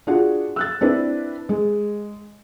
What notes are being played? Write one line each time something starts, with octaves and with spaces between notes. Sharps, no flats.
D4 F4 F#4 G#4 F#5
E6 F#6 A6
C4 D4 E4 B4
G#3